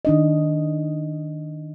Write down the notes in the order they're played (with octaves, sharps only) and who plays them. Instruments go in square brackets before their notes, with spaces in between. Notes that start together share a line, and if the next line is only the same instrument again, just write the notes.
[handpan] D#3 D4 D#5